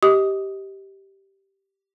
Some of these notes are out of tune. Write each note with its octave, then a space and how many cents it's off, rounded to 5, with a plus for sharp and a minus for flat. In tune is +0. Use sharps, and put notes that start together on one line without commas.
G4 -10 D#5 +20 D#6 +10